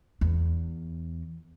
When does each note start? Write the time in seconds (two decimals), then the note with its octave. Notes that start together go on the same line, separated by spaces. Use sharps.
0.21 E2